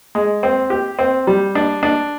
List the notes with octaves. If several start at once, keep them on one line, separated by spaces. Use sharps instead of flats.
G#3
C4
G4
C4
G3
D4
D4